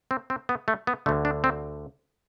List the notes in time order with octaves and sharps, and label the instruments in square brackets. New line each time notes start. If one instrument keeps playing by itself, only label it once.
[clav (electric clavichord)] C4
C4
B3
A3
B3
D3 A3
D2
D4
C4